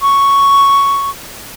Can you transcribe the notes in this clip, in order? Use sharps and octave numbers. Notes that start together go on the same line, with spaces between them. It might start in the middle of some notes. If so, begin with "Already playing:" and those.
C#6